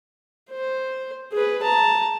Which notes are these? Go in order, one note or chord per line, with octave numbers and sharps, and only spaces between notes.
C5
G#4 B4
A5 A#5